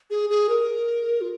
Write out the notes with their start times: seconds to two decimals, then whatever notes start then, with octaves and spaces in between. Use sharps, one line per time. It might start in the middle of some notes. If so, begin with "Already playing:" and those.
0.10 G#4
0.30 G#4
0.49 A#4
1.21 F4